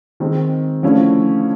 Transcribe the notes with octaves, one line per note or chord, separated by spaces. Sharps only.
D#3 G#3 C4
D3 F3 A3 C#4 E4